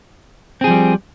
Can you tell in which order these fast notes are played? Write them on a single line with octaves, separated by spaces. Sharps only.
C4 G#4 F3 G3